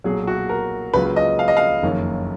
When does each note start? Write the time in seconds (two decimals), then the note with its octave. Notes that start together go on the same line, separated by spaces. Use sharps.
0.04 B1 A#2 F#3 G#4
0.27 F#4
0.49 A#4
0.94 C#2 C#3 F#3 A#3 F4 B4
1.16 D#5
1.39 F5
1.48 D#5
1.57 F5
1.83 F#1 F2 D#3 A#3 C#4